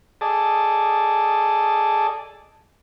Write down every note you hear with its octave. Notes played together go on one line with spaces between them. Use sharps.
G#4 A4 D5 D#5 A5